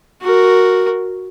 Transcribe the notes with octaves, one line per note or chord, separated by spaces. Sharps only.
F#4 A#4